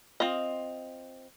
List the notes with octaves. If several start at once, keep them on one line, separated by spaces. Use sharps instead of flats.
C4 F4 D#5